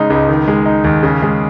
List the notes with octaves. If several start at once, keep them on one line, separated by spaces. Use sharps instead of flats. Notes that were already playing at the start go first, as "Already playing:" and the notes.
Already playing: C#3 G#3 D#4
C#2
D#3
G#3
D#4
D#2
C#3
G#3